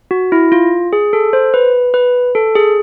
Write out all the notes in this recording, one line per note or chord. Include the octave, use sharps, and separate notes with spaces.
F#4
E4
F4
G#4
A4
C5
B4
B4
A4
G#4